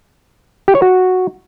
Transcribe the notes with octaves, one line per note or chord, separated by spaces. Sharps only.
G4
C#5
F#4